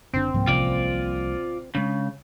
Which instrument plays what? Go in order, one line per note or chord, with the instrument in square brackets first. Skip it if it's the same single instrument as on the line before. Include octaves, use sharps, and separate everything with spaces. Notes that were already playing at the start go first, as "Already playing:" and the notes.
[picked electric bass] F#1 D3 D4 [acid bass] C4
[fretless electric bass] C2 F3 A#3 [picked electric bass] G#2
[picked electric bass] A1 C3 C#4 [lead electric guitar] F4 D5
[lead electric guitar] C#3 [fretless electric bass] G#3 D4